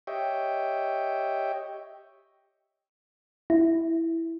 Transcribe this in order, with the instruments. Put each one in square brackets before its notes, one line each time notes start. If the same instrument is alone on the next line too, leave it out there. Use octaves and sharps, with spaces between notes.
[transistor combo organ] G4 C#5 D#5 E5 G5
[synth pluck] E4